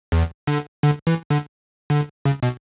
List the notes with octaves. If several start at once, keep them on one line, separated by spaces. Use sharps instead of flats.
E2
D3
D3
E3
D3
D3
C#3
B2